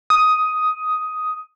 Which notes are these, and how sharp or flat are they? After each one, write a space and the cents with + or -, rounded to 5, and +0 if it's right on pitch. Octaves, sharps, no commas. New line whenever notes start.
D#6 +10